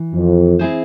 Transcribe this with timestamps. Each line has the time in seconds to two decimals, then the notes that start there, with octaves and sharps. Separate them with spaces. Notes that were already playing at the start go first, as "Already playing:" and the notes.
Already playing: E3
0.13 F2
0.59 C4 E4 G#4 C5